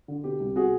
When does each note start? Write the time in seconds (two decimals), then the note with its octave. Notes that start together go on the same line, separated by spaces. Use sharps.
0.08 D3
0.24 B2 G4
0.40 C2
0.56 B2 F#4 G#4